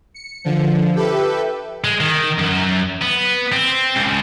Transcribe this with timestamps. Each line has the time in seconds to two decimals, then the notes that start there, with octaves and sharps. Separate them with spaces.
0.14 C#7
0.44 D3 F3
0.95 G4 A4 B4 E5
1.84 G#3
2.01 D#3
2.39 F#2
3.01 B3
3.52 C4
3.96 C#2